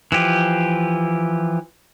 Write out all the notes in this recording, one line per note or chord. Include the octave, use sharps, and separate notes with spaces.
E3 F3 G4